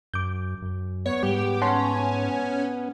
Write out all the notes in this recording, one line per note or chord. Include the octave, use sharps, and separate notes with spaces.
F#2 D6 G6
F#2
B3 C#5
G#2 G3 G4
C#4 F#5 A5 C6